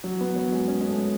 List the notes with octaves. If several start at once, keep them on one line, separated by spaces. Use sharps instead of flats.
F#3
B3
F#3
G#3
C#4
G#3
A3